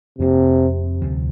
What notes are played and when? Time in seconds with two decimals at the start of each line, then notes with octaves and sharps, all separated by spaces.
0.19 F1 F2 C3 F3 A#3
1.02 D2 C3 F3